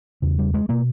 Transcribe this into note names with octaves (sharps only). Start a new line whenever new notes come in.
E2 C#3
G3
G#3
B2 A#3